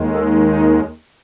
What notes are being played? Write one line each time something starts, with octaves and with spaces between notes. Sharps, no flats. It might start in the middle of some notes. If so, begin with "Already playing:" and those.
Already playing: D#2 D#3 G#3
A4
D#4